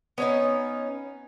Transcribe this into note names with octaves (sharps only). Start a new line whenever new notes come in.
B3 C#4 D#4